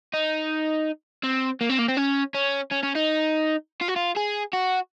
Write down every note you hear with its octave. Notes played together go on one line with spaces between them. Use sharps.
D#4
C4
A#3
C4
A#3
C4
C#4
C#4
C#4
C#4
D#4
F4
F#4
F4
G#4
F#4